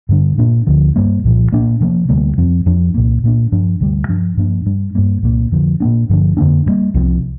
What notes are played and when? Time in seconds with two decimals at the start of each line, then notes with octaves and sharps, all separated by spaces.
0.09 G2 D3 G3 D4
0.38 A#2 A#3 D4
0.67 D2 D3 F3
0.96 G2 G3 A#3
1.24 C2 A#2 F3
1.52 A#2 A#3 D4
1.81 C3 F3 A#3
2.09 D2 C3 G3 A#3
2.38 F2 F3 C4
2.66 F2 F3 D4
2.94 C2 A#2 A#3
3.24 A#2 A#3 D4
3.52 G2 F3 D4
3.81 D2 C3 G3
4.09 G2 F3 D4
4.37 G2 F3 A#3 D4
4.66 G2 G3 D4
4.95 G2 G3 A#3
5.23 C2 A#2 A#3
5.52 F2 D3 F3
5.80 A#2 A#3 D4
6.09 G2 D3 F3 D4
6.37 F2 D3 A#3 D4
6.66 G2 G3 A#3
6.94 C2 C3 F3 C4